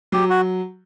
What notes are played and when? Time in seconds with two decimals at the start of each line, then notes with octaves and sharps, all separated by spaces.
0.12 F#3 G4
0.30 F#4